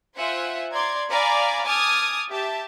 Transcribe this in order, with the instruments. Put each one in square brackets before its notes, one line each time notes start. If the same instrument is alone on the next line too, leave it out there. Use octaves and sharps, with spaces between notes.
[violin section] F4 C5 E5 F#5 G#5
D5 A#5 C6 G#6
D5 F5 G#5 A#5 B5 D6
G#5 A5 D6 D#6 F6 G#6
G4 E5 A5